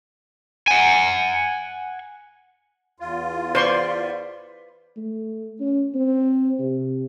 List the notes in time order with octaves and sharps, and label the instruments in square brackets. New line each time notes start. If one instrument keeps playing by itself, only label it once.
[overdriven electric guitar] F#5 G#5
[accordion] E2 F4
[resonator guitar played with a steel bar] B4 D5 [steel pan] C5 C6 C#6
[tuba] A3
C#4
C4
C3